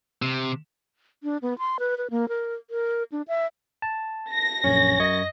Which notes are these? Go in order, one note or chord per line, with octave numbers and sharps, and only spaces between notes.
C3
D4
B3
C6
B4
B4
A#3
A#4
A#4
D4
E5
A5
A#6
A#1 F#2 C#4
F#2 D#5 C#6 G#6